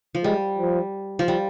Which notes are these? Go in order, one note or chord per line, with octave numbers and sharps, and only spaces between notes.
F3
G3 G#3
F3
F3
G3